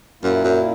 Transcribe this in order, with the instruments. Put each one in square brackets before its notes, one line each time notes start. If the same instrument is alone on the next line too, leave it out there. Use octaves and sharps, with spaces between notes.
[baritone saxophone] F#2 [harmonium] A#2 A#3 E4
[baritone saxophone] F#2